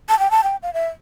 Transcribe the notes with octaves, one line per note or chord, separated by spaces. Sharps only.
A5
G5
A5
G5
F5
E5